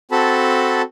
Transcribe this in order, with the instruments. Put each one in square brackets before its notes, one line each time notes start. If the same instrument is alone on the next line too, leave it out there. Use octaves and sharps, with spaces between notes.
[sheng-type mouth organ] C4 F#4 A4 A5 B5